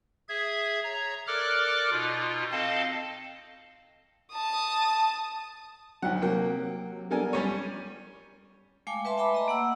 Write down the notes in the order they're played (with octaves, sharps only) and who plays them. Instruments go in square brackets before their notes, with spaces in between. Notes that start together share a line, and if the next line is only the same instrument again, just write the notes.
[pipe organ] G#4 E5 G#6
C#5 A#5
A4 A#4 D5 D6 F6 F#6
B2 D#4 F4
C4 A4 D#5 F5 A5
[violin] A5 D#6
[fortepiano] D2 F#5 [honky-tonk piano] F#3 D#4
[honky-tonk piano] C3 F#3 [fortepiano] A#3 G5
[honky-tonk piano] G3 B3 D4 [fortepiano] A4 A#4 G#5
[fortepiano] G3 C#4 C#5 [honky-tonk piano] D#7
[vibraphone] G#3 A3 F5 G5 G#5 D6
B4 E5 A5 C6
E5 G5 A5 B5 D6
D#5 A#5
A#3 F#5 E6